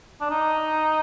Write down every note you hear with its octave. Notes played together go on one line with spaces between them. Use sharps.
D4
D#4